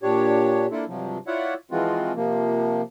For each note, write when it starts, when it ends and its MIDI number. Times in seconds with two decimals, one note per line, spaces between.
0.03 0.67 46
0.03 0.67 62
0.03 0.67 67
0.03 0.67 73
0.71 0.84 58
0.71 0.84 62
0.71 0.84 64
0.71 0.84 65
0.71 0.84 69
0.88 1.18 43
0.88 1.18 48
0.88 1.18 53
0.88 1.18 54
1.27 1.54 64
1.27 1.54 65
1.27 1.54 73
1.27 1.54 74
1.27 1.54 76
1.27 1.54 78
1.71 2.12 52
1.71 2.12 53
1.71 2.12 56
1.71 2.12 60
1.71 2.12 65
1.71 2.12 66
2.16 2.82 48
2.16 2.82 53
2.16 2.82 58